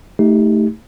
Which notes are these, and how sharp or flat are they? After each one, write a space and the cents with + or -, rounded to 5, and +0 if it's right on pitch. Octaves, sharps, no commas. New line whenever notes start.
A3 +0 D#4 +25 G4 +10